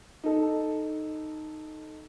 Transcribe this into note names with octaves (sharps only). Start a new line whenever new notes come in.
D#4 A4